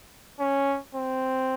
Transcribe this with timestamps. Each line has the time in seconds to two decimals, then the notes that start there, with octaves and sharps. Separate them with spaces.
0.40 C#4
0.95 C4